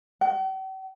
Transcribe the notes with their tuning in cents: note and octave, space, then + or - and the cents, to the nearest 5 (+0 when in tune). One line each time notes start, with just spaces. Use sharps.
G5 -45